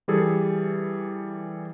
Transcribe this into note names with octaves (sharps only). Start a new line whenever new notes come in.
E3 G3 G#4 A4